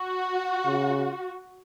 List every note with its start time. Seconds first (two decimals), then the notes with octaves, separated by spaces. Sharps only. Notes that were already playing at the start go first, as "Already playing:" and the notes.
Already playing: F#4
0.65 C#3